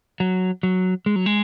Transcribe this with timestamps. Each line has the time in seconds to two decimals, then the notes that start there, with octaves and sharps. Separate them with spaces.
0.20 F#3
0.63 F#3
1.06 G#3
1.16 F#3
1.26 G#3